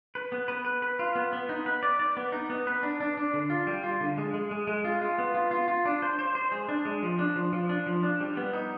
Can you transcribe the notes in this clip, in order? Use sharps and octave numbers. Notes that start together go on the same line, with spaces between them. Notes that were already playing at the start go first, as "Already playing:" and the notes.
B4
B3
B4
B4
B4
F4
B3
B3
D#4
B4
D5
D5
B3
D#4
B3
B4
D4
D4
D4
D3
F4
G3
F4
D3
G#3
G#3
G#3
G#3
F4
F4
B3
F4
F4
F4
D4
C5
C5
C5
G#3
D4
G#3
F3
D4
F3
F3
D4
F3
D4
G3
B3
D#4